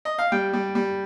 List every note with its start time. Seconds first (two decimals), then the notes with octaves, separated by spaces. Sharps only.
0.05 D#5
0.18 F5
0.32 G3 G5
0.53 G3
0.75 G3